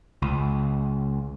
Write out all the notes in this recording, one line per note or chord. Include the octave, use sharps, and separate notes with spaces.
C#2